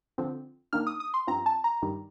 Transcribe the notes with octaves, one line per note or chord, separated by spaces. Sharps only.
D3 F3 C4
D#3 A#3 D4 F6
D#6
D#6
C6
G2 F3 C4 A#5
A5
A#5
G2 D#3 G3